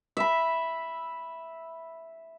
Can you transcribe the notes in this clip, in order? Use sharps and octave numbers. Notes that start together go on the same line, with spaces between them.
E5 B5